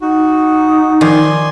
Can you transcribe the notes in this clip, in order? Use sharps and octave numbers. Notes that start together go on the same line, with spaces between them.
D#4 F#4
D#3 F3 D5 G#5 C6